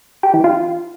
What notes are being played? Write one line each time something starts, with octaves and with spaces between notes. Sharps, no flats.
G4
E3
F4